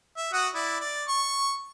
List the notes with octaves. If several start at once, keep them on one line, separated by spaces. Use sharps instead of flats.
E5
F#4 F#5 D#6
E4 D5
D5
C#6